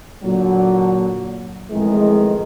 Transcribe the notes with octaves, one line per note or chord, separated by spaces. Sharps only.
A#2 D3 F#3
F2 A2 D#3 E3 G#3